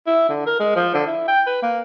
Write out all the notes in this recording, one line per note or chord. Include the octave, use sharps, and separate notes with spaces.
E4
D3
A#4
G#3
F3
D3
E4
G5
B4
A#3